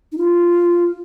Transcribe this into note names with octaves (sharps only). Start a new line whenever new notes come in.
D#4
F4